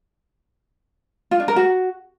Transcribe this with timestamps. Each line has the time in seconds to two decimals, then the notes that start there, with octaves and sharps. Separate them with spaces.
1.31 F4
1.40 D4
1.48 A#4
1.56 F#4